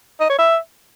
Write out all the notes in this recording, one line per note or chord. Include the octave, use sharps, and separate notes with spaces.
D#5
C#5
E5